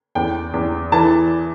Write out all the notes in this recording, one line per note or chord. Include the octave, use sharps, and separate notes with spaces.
E2 G5
E2
E3 A5